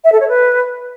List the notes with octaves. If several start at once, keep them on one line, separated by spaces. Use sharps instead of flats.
E5
A4
C#5
B4